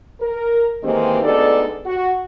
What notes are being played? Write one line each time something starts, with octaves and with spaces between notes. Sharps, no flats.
A#4
D#3 E3 G#3 A#3 C4 G4
D2 G#3 B3 D#4 A4 D5
F#4